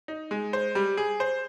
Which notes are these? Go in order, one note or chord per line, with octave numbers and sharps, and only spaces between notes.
D#4
G#3
C5
G3
G#4
C5